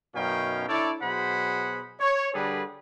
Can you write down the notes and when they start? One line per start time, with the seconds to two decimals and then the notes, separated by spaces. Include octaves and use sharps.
0.15 F#2 B2 C#4 D#4 F5 G5
0.68 D4 E4 A4 C#5 D5
1.02 B2 F#3 G#4 C5 F#5 B5
1.99 C#5
2.34 D3 G3 D4 G#4 A4 B4